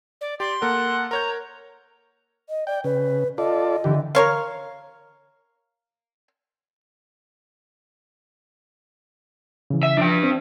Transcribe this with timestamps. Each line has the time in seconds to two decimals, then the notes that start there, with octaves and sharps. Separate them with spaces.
0.21 D5
0.40 G4 D5 C6
0.62 A#3 A4 A#4 F#5
1.11 A#4 C#5 A#5 G6
2.50 D#5
2.67 D5 G5
2.84 C#3 B4
3.38 F4 A4 D5 D#5
3.84 D3 E3 G4
4.15 A#4 C#5 F5
9.70 C#3 E3
9.83 E5
9.97 F3 D4 G5
10.24 C4